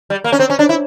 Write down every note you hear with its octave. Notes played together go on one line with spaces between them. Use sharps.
G3
A#3
C#4
C4
C#4
D4
E4